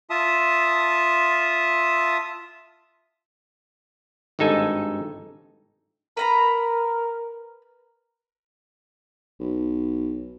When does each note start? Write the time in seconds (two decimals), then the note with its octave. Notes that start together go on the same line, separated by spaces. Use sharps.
0.10 F4 E5 A5 D#6
4.39 G#1 G2 D#4 A4 G#5
6.17 A#4 B4 A#5 B5
9.40 B1